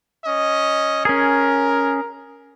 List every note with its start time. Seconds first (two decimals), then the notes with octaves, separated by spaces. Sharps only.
0.25 C#4 D#5
1.05 C#4 G#4 A#4